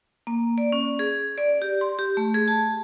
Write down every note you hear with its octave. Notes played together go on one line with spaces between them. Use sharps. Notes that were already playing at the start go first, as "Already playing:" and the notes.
A#3
D5
C#4
G#4
D5
G4
C6
G4
A3
G#4
A5